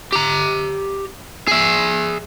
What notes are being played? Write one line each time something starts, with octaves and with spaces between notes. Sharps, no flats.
G4 A#5
G#4 E5